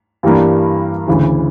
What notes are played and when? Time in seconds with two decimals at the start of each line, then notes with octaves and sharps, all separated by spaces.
0.23 G2 E3 G3 A#3 D4
1.08 D2 C#3 E3